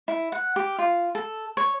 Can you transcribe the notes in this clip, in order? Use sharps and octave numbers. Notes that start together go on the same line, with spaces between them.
E4
F#5
G4
F4
A4
C#5